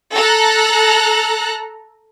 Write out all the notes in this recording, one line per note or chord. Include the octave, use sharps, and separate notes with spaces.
A4 A#5 F#6